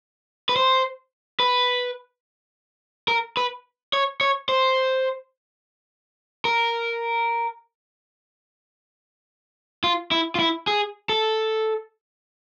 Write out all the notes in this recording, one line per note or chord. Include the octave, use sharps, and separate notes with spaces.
B4
C5
B4
A#4
B4
C#5
C#5
C5
A#4
F4
E4
F4
E4
G#4
A4